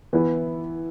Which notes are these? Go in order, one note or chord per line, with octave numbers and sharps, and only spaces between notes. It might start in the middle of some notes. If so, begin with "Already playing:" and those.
E3 B3 E4 B4